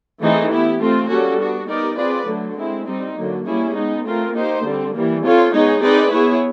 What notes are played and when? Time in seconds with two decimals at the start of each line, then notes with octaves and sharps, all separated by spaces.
0.21 E3 A3 C4 D#4 G#4
0.50 B3 E4 G4
0.80 A3 C4 F4
1.09 G3 A#3 C#4 F#4 A4
1.39 B3 D4 F#4
1.68 B3 D#4 G4 A#4 D5
1.98 C4 F4 G#4 B4 D5
2.27 D3 F#3 A3
2.57 G#3 C4 E4
2.87 G3 C4 D#4
3.17 D3 F#3 A#3
3.45 G3 A#3 C#4 E4 G#4
3.75 G#3 B3 D#4
4.05 A3 C4 F4 A#4
4.34 A#3 D#4 G4 C5
4.64 D3 G3 C4
4.93 E3 G3 A#3
5.23 C4 F4 A4 C#5
5.53 G#3 B3 D#4 G#4 C#5
5.82 C4 D#4 G#4 B4 D5
6.12 B3 E4 G#4 C#5